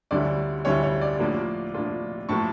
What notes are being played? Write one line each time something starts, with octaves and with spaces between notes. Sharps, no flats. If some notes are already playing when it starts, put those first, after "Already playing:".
D2 D3 G3 C#4 E4 D5
D2 D3 G3 C#4 E4 C#5
C#5
D5
A2 F3 A#3 D4 F4
A2 F3 A#3 D4 F4
A2 F3 A#3 A5 C#6